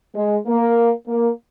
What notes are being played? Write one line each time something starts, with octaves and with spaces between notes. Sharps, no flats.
G#3
A#3
A#3